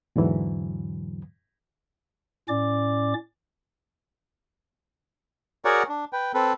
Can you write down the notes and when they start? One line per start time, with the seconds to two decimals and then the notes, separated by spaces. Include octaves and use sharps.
0.16 E2 G#2 D3 E3 F#3
2.49 A2 C#4 D5 D6
5.65 F#4 G#4 A#4 C#5 D5 F#5
5.89 D4
6.13 B4 G5
6.34 C4 A4 B4